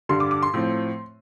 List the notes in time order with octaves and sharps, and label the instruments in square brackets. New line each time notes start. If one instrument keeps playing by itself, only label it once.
[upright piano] G2 D3 G3 C6
D6
D6
C6
A2 F3 C4